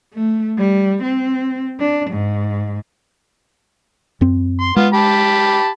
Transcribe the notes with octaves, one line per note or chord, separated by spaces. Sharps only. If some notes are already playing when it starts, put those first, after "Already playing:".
A3
G3
C4
D4
G#2
F#2 C4
C6
G#3 B3 F4
G4 A5 B5